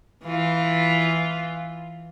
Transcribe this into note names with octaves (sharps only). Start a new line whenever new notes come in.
E3 F4